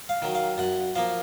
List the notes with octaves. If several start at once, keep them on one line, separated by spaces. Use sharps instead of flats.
F5
D#3 F#3
F5
F#2 F#5
F3 A#3 F5